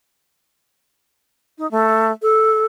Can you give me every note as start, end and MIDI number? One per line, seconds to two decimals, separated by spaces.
1.58 1.69 63
1.71 2.12 57
2.22 2.66 69